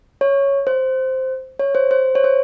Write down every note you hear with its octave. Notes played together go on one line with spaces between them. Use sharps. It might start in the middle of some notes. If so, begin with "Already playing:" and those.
C#5
C5
C#5
C5
C5
C#5
C5